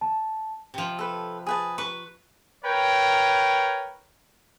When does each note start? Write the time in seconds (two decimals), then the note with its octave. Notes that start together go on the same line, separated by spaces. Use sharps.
0.01 A5
0.74 C3 F3
0.99 A4 B4
1.46 G#4 B4 A5
1.78 B4 C#6
2.63 A#4 B4 C#5 G5